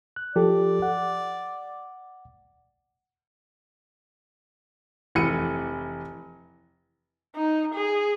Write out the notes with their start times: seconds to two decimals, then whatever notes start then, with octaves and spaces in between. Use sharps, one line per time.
0.16 F#6
0.36 F3 G4 A4 D5
0.82 F#5
5.15 F1 E3 C#7 D#7
7.35 D#4
7.74 G#4